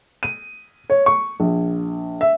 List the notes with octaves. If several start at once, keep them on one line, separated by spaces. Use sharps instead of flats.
D#7
C#5
C#6
A#1
E5